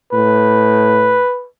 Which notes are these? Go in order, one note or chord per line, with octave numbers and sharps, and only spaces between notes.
A2 B4